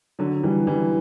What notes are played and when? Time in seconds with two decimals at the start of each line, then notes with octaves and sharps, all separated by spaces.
0.19 D3 F#3
0.43 E3 G3
0.67 E3 G3